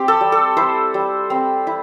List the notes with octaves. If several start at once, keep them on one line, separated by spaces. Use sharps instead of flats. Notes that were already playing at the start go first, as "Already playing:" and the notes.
Already playing: C4 G4
A4
G3
A4
E4 C5
G3
C4
E4